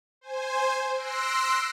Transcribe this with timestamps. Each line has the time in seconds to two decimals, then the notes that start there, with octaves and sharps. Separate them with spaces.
0.21 C5 G#5
0.94 C6 E6 F#6 A#6 C7 D7